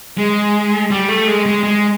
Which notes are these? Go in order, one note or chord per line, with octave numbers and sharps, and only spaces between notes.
G#3
G3
A3
G#3
G#3
G#3